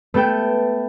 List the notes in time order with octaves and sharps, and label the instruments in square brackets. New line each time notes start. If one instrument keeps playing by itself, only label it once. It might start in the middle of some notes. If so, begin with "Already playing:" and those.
[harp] A3 B3 A4 G5